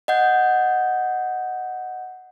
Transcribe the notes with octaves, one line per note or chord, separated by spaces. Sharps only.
D#5 F#5 G6